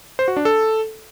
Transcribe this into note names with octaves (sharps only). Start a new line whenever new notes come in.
C5
F#4
D4
A4